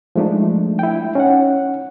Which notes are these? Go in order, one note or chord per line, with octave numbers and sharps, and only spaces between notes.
F3 G#3 A3 D4 D#4
E4 G5
C#4 D#4 F#5